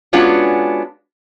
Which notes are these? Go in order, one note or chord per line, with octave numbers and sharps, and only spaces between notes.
G#3 B3 C#4 D4 F4 F#4